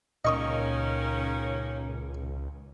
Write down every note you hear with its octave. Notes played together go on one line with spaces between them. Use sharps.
C#2 A#2 D#3 A#3 C#4 D#5 C#6 D#6